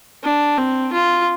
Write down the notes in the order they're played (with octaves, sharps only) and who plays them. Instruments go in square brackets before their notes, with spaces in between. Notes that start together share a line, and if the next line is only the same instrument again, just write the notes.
[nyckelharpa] D4
C4
F4